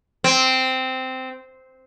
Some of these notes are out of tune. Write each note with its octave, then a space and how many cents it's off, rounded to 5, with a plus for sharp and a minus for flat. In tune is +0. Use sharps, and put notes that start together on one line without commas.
C4 -10